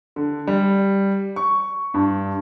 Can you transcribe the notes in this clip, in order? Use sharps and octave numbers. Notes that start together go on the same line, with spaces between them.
D3
G3
C#6
G2